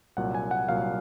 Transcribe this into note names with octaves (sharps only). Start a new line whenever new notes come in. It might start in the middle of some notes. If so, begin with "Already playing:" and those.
C2 A#2 F#3 F#5
G#5
F#5
C2 A#2 F#3 F5